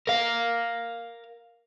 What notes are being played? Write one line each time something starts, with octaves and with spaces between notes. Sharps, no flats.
A#4 F5